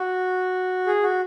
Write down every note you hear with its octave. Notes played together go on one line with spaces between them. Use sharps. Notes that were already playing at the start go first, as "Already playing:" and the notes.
Already playing: F#4
G#4
F#4